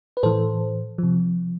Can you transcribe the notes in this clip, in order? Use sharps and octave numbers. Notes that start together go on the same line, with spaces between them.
B4
A2 E3 A4 C5
C3 F3